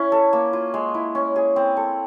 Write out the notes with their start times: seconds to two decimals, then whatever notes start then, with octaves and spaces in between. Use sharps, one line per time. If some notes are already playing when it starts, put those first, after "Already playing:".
Already playing: C#4 E4
0.12 A4
0.33 A#3
0.53 F4
0.74 G#3
0.94 E4
1.15 C#4
1.36 G#4
1.56 C4
1.77 A4